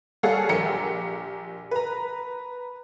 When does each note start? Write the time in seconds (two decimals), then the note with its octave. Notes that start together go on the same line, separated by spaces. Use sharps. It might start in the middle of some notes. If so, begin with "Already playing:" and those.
0.23 G3 G#4 A4 C#5 F5 F#5
0.49 A#1 G4 A#4 C#7
1.71 B4 A#5